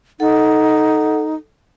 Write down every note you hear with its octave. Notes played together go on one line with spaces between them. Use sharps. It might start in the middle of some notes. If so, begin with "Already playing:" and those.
D#4 A4 F#5